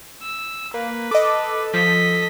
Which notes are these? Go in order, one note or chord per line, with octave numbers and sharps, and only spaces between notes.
E6
A#3 B4
A4 D#5 D6
F3 D#5 B6